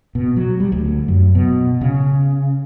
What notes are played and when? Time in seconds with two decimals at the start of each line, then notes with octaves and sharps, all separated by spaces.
0.15 B2
0.36 F#3
0.60 G3
0.72 D2
1.08 F#2
1.35 B2
1.81 C#3